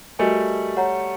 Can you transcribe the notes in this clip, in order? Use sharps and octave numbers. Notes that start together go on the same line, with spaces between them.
G3 A3 F#4 A#4 D#5 G#5
C#5 F#5 A#5